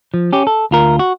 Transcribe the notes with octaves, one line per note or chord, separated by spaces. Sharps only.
F3
C#4 G4
A4
D2 F4 A#4
F#4